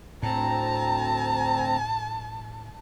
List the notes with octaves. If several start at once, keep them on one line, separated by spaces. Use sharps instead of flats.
D2 A2 C4 A5 A#5